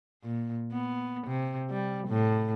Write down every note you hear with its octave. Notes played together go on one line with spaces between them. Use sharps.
A#2
B3
C3
G3
A2